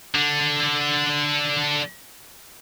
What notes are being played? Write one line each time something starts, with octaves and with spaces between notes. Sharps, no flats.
D3 D4